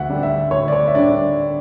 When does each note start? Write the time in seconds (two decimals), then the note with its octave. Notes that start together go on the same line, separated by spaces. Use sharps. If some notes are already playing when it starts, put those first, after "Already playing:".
Already playing: D2 E5 F#5
0.09 D3 G3 D4
0.23 E5
0.51 D2 C#5
0.68 D5
0.73 C#5
0.87 E5
0.95 D3 G3 D4 D5